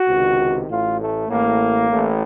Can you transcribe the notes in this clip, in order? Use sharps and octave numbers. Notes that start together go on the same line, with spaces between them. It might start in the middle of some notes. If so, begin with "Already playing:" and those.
Already playing: F#4
C#2 C3 D#3
A1 A2 F4
A3
A1 A2 A#3
A1 A2